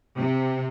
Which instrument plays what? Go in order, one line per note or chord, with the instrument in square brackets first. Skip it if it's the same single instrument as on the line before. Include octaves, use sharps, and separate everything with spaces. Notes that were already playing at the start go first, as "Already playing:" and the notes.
[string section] C3